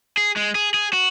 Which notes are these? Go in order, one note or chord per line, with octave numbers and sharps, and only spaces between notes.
G#4
G#3
G#4
G#4
F#4